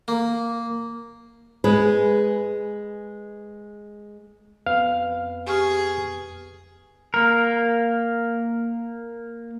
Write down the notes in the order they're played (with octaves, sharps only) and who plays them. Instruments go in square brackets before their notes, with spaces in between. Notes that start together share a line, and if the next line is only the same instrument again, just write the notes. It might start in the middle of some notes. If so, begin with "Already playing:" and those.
[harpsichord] A#3
[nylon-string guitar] G#3 G#4 B4
[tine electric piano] F2 B3 B4 [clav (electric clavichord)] F5
[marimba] G4 C#6 F6 [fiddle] G#4
[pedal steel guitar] A#3 A#4